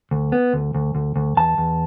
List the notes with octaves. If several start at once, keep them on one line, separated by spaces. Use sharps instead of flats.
D2
B3
D2
D2
D2
D2
E2 A5
E2